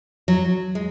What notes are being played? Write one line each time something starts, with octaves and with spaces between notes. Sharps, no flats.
F#3
G#3